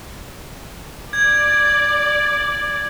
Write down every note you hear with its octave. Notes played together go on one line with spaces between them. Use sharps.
D5 G#6